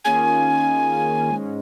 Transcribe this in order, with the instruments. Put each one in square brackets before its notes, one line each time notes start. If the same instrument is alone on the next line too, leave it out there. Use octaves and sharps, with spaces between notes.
[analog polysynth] D#3 A#3 C#4 F4 G#4 [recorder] G#5
[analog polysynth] G#2 G#3 C#4